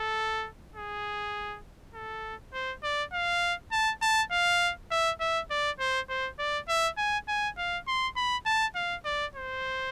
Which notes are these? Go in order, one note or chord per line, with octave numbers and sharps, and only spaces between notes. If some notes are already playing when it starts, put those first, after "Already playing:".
Already playing: A4
G#4
A4
C5
D5
F5
A5
A5
F5
E5
E5
D5
C5
C5
D5
E5
G#5
G#5
F5
C6
B5
A5
F5
D5
C5